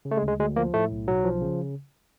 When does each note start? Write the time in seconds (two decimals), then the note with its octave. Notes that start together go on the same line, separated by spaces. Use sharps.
0.05 C#3
0.11 A3
0.17 G#3
0.23 D2
0.28 G#3
0.39 D2 G#3
0.56 F3 A#3
0.74 A2 A3
0.91 B1
1.08 B1 F#3
1.24 F3
1.42 C#3